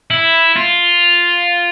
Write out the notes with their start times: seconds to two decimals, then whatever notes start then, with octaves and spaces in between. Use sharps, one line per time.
0.11 E4
0.56 F4